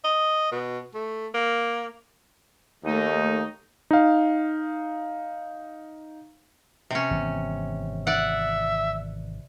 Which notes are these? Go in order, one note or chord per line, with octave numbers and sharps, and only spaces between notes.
D#5
B2
A3
A#3
D#2 A3 D#4
D#4 F5
C3 C#4
G#1 E3 B3
D5 E5 F#5